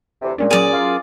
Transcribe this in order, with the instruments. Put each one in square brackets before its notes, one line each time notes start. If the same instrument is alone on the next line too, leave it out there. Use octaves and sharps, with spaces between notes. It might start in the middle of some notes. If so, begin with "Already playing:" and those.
[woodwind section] D2 C3 E3
[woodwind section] A#2 [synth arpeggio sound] G#3 C#4 D4
[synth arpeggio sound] F#3 C#4 A#4 [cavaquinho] G#4 D5
[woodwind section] F4